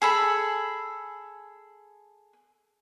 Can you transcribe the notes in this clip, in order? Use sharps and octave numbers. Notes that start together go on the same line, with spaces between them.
G#4 A4 B5